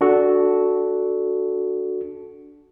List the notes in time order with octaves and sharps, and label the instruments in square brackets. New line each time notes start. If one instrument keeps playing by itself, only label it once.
[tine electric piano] D4 F#4 A4